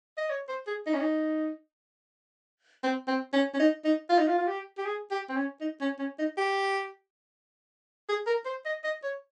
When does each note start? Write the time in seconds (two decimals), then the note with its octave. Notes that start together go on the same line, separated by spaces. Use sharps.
0.18 D#5
0.30 C#5
0.49 C5
0.67 G#4
0.86 D#4
0.93 C#4
1.00 D#4
2.83 C4
3.08 C4
3.33 C#4
3.54 C#4
3.59 D#4
3.84 D#4
4.10 F4
4.19 D#4
4.28 F4
4.38 F4
4.47 G4
4.78 G4
4.86 G#4
5.11 G4
5.29 C4
5.36 C#4
5.61 D#4
5.81 C#4
5.99 C#4
6.19 D#4
6.37 G4
8.09 G#4
8.27 A#4
8.46 C5
8.65 D#5
8.84 D#5
9.04 C#5